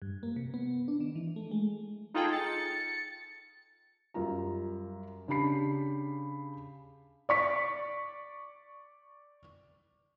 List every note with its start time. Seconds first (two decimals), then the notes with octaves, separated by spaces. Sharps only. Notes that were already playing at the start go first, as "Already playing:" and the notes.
0.02 G2
0.23 A#3
0.36 C3
0.54 B3
0.88 D4
1.00 D#3
1.16 E3
1.36 A3
1.51 G#3
2.14 D#4 F4 G#4 A4 G5
2.32 A6 C#7
4.14 F#2 G3 F4 A#5
5.28 C#3 D4 G4 B5 C7
7.29 D5 C#6 B6